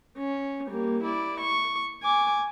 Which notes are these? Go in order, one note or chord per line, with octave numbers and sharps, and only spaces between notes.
C#4
G3 A#3
E4 D5
C#6
G#5 D6